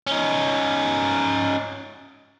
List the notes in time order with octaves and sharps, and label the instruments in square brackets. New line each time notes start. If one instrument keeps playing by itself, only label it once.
[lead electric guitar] C#4 D#4